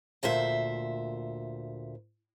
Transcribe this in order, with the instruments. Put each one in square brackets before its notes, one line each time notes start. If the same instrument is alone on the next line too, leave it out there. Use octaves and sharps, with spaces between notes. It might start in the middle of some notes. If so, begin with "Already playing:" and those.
[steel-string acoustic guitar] D2 A#2 C5 E5